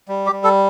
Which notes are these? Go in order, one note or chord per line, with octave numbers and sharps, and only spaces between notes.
G3
G4
G3
A4